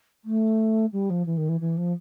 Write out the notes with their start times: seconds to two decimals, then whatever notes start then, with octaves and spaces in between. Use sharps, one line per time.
0.24 A3
0.92 G3
1.09 F3
1.25 E3
1.37 D#3
1.48 E3
1.60 E3
1.77 F3